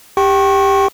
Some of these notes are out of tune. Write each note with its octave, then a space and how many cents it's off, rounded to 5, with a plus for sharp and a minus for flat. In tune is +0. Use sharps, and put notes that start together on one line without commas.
G4 +15 G5 -20 C#6 -30